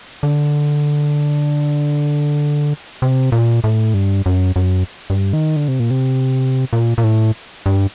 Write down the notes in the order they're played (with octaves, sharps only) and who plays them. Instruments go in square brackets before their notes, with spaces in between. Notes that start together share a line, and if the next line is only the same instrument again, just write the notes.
[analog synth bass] D3
C3
A#2
A2
G2
F#2
F#2
G2
D#3
D3
C3
A#2
C3
A#2
A#2
A2
G2